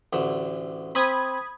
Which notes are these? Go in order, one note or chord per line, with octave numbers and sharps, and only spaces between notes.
A1 D2 D3
C4 B5 D#6 G#6